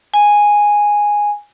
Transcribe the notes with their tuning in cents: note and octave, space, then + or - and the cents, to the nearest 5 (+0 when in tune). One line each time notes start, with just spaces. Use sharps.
G#5 -5